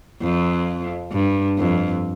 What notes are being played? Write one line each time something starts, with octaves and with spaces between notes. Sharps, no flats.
F2
G2
F2